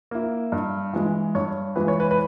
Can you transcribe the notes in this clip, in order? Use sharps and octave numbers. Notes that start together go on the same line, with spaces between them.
A#3 E4
G2
E3 G#3
G2 C#5
E3 G#3 B4
C#5
B4
B4